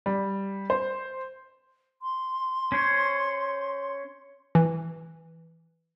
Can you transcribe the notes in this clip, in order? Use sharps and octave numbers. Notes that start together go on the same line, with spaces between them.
G3
C5
C6
C#4 C5 C#5
E3